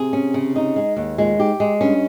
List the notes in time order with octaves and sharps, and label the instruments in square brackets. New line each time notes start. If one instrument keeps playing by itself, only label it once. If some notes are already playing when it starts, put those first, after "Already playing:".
Already playing: [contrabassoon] C3 [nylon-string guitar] G#4
[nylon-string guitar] C#4
C#3
D#4
G#3
D#2
[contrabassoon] A#2 [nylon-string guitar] G#3
[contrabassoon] G#2 [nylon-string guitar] G4
[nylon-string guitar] G#3
[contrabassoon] G2 [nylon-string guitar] C#4